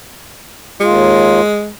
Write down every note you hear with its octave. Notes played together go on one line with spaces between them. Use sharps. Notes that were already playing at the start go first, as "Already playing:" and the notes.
D#2 G#3 F4